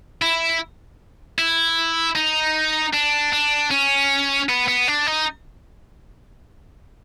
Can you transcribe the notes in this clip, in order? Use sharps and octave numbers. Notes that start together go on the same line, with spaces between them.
E4
E4
D#4
D4
D4
C#4
B3
B3
D4
D#4